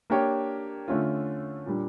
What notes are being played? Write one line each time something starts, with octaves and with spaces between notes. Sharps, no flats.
A#3 D4 G4 C#5
D3 A3 C#4 F4
A#2 G3 D4